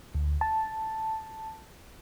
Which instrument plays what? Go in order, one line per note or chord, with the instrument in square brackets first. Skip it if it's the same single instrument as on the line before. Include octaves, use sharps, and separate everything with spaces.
[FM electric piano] D2
A5